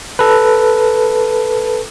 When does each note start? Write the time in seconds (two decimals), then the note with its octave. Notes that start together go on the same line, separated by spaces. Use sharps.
0.19 A4 B4